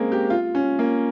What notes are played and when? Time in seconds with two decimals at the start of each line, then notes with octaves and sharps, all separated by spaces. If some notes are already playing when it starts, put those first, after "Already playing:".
Already playing: G#3 A#3 C4 C#4
0.12 G4
0.30 F4
0.55 C#4
0.79 A#3